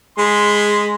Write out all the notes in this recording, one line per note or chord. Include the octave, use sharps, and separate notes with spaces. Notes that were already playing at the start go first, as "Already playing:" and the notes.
G#3 B5 C6